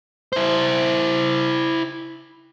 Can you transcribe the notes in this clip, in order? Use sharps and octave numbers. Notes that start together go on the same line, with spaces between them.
E4 C5